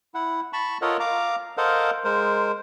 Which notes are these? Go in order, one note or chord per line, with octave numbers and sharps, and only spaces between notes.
E4 F#5
A5 B5 C#6
F4 A4 A#4 C#5 D#5 F#5
F5 A#5 D6
A4 A#4 C5 D#5 F5 F#5
G#3 A#4 C5